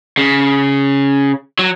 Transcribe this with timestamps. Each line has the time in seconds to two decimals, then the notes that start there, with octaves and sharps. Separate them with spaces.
0.18 C#3
1.59 F#3